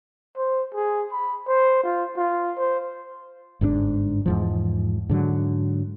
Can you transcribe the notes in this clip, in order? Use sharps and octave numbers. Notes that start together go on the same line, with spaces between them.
C5
G#4
B5
C5
F4
F4
C5
G1 G#2 C#3 D4
E2 G#2 F3
G#2 D3 F#3